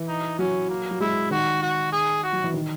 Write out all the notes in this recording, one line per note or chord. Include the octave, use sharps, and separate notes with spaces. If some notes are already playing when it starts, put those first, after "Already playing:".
Already playing: E3
D#4
F#3 C#4
A#3
F#3
G#3 E4
D#3 F#4
F#4
G#4
F#4
F#3
E3
D#3